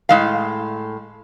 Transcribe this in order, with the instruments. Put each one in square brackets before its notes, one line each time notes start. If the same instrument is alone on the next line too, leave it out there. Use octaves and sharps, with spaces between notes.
[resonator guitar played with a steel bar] A2 G#3 F5